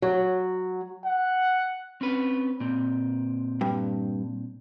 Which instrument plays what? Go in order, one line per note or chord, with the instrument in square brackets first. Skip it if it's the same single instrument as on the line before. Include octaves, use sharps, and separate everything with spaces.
[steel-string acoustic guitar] F#3
[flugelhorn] F#5
[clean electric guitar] C4 C#4 B4
A#2 C4
[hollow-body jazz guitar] G2